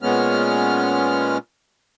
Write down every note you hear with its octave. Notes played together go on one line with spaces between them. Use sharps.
A#2 G#3 B3 C#4 F6